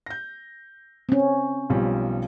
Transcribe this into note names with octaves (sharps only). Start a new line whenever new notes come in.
G6 A#6
C4 C#4
B1 F3 G3